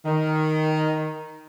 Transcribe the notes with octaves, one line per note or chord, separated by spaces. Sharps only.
D#3